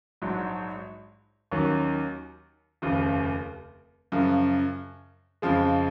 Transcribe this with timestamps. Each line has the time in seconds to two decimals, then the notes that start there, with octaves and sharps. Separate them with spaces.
0.22 A#1 G#2 F#3
1.52 D#2 D#3 F#3 C#4
2.82 F1 D#2 C#3 F3
4.12 F#2 C#3 F3
5.42 F2 C#3 F3 G#3